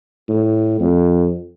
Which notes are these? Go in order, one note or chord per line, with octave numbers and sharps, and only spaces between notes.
A2
F2